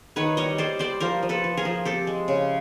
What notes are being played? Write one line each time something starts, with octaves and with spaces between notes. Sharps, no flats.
D#3 B4 C#5
G3 C#5 D#5
G3 C5 D5
G3 C5 D5
F3 A#4 C5
F3
A4 B4
F3
G#4 A#4
F3
C4 G4 A4
G#3
C#3